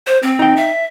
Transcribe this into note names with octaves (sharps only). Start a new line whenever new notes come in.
C5
C4
D#4 G5
E5